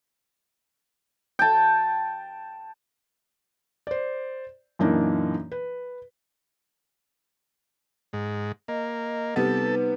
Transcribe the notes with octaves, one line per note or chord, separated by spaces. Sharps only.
G5 A5
C5 D5
F#2 A#2 E3 A#3 D4 D#4
B4
G#2
A#3 D#5
C3 G3 B3 D#4 A4 B4